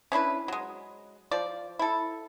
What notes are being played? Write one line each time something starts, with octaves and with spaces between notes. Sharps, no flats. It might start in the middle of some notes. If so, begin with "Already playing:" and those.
C#4 D4 E4 B4
F#3 G#3
F3 D5
E4 A4